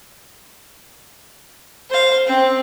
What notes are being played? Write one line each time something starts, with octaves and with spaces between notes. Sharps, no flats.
C5 F5
C4